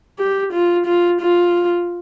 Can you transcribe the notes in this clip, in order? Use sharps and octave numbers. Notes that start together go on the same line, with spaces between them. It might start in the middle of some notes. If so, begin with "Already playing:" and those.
G4
F4
F4
F4